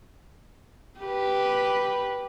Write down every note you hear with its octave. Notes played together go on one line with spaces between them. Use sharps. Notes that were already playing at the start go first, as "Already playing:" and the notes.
G4 B4